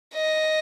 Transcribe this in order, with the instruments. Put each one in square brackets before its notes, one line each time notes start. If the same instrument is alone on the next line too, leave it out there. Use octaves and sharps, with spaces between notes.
[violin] D#5